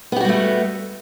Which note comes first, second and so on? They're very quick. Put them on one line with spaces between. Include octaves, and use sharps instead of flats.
B3 G4 F#4 G3 A3